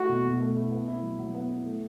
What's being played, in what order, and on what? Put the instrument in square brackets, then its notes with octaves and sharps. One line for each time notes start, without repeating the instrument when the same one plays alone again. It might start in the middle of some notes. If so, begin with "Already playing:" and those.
Already playing: [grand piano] A3 E4 [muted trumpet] F#4
[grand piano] B2
B2
A3
E4
B3
E4
F#3
F#3
B3
E4
A3